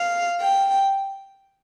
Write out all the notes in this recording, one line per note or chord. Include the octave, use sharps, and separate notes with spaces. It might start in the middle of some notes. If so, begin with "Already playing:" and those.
Already playing: F5
G5